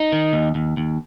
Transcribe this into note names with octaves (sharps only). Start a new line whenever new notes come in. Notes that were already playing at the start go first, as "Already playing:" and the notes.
Already playing: D#4
D#3
D#2
D#2
D#2